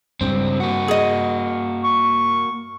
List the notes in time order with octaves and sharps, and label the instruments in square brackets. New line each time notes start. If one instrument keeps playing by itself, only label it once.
[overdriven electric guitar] C#2 C4 [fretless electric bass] G2
[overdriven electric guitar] A#3 F#4
[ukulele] G#4 D#5
[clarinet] C#6